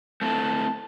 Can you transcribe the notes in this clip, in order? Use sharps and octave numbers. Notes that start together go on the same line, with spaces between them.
A3 C4 E4 A4 A5